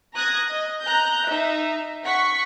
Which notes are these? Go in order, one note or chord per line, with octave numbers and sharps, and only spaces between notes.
A#5 D#6 F#6 G#6 A#6
D#5
A#5 F#6 G6
D#4 E5
F#5 C#6 B6